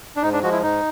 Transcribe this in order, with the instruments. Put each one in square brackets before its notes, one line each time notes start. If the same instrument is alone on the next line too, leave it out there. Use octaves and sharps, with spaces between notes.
[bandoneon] D4
G#2 D#4
D4
F3 G#3 F#4
E4
G#2 D#4